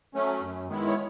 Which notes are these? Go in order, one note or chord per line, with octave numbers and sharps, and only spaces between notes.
F#3 A3 C#4
F#2
D#3 G#3 B3 E4
C#5